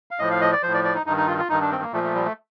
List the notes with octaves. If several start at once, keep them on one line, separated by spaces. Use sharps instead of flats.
F5
A2 F3 D#5
F5
D#5
D5
A2 F3 C5
D5
D5
D#4
G2 D#3 D#4
D#4
F4
F4
G2 D#3 D#4
D4
C4
A#3
A#2 F3 A3
A3
G3
A3